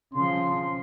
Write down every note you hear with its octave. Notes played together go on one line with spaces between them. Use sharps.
C#3 F3 C6